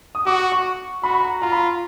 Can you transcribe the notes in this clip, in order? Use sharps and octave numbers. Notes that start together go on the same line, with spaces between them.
D#6
F#4 D6
C#6
F#4 B5
B5
A#5
F4 A#5
B5
C6